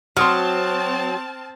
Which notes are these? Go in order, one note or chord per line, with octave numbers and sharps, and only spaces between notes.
F#3 C4 A5 C6 D#6 F6